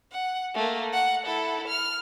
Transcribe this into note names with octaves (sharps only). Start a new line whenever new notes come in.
F#5
A3 A#3
F#5
E4 A4
F6